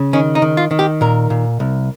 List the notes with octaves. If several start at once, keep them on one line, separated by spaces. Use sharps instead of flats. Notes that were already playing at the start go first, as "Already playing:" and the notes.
Already playing: C#3
D#3 C#4
D#4
D#3
F4
D#3
G4
A#2 A#4
A#2
C2